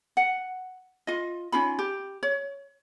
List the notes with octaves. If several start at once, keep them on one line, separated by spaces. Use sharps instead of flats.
F#5
F4 D#5
C#4 D#4 F4 B5
G4
C#5